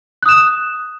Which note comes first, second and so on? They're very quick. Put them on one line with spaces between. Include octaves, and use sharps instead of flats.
F#6 D#6 E7